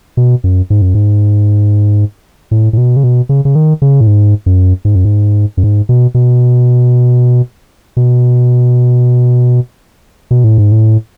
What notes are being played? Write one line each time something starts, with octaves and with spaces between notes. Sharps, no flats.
B2
F#2
G#2
F#2
G#2
A2
A2
B2
C#3
B2
C#3
C#3
D#3
C#3
A2
G#2
F#2
G#2
F#2
G#2
F#2
G#2
B2
B2
B2
B2
A2
G#2
A2